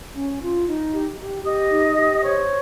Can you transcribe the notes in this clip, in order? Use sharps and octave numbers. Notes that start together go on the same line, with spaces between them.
C#4
F4
D#4
G4
G4
G4 D#5 D#6
D#4
G4
C5 C#5 C#6